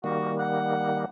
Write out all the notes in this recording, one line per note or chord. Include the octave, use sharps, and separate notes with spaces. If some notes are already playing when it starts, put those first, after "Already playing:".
D#3 G3 A#3 F#4
F#5